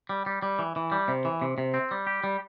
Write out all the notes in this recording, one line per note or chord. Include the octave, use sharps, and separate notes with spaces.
G3
G3
G3
E3
E3
G3
C3
E3
C3
C3
C4
G3
G4
G3